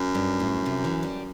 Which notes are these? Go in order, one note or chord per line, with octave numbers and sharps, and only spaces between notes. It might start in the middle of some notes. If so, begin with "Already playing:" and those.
Already playing: F#2
G2
A2
C3
E3
G3